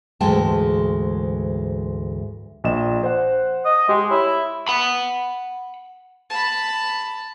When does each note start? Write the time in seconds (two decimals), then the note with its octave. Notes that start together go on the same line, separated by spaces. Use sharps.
0.20 D2 G#2 E3 G#3 G5 A5
2.64 A#1 D#5 E7
3.03 C5 F#5
3.65 D#5
3.89 G#3 G4
4.11 E4 C#5
4.68 F#5 B5
6.30 A5 B5